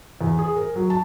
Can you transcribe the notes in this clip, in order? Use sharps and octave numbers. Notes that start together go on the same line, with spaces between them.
E2
G#4
A#4
F#3
A5